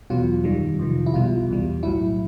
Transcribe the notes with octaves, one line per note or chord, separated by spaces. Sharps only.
E2 B2 F#3 F4
F#2 D#3 G3
F2 C3 D#3
E4
B1 B2 G3 F4
E2 B2 G3
B1 A2 F#3 E4